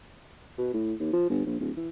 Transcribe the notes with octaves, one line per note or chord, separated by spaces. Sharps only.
B2
A2
D#2
F3
G1
A#1
D1
E3